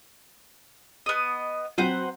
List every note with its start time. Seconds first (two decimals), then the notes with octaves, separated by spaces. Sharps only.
1.06 B3 D#5
1.78 F#3 C4 B4 C5 F#5